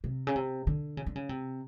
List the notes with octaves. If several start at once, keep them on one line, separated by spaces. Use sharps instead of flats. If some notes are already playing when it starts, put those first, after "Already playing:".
C3
C#3
C3
D3
C#3
D3
C#3
C3